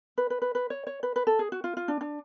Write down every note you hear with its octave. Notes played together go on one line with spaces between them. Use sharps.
B4
B4
B4
B4
C#5
C#5
B4
B4
A4
G#4
F#4
F4
F4
D4
D4